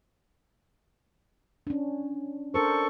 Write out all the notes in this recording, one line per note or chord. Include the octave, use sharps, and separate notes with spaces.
C#4 D4
D4 A4 A#4 C5 C#6